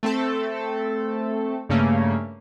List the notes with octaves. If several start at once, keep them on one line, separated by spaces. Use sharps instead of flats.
A3 C4 A4
G2 C#3 A3 A#3 C#4